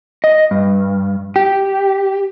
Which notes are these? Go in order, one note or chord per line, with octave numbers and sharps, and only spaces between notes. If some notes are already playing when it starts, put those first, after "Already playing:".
D#5
G2
G4